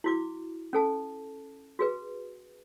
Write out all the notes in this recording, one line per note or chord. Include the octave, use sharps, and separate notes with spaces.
E4 F#4 D6
C#4 A4 A5
F#4 G#4 B4